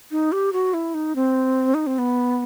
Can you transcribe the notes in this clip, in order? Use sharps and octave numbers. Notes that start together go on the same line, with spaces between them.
D#4
G4
F#4
E4
D#4
C4
D#4
C4
B3